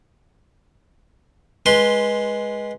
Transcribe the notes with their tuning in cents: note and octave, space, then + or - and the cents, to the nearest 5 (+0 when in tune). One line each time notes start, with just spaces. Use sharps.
G#3 +0 B4 -20 C6 +0